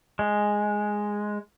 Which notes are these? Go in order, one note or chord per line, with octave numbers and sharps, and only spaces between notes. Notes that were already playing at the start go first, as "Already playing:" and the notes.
G#3